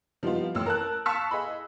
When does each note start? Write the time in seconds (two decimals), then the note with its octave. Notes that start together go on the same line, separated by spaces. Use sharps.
0.23 F3 G3 B3 D#4 F4
0.55 A1 E6
0.66 A#4 A5 F#6
1.06 F5 A5 C#6 E6 B6 C#7
1.31 G#4 D#5 B5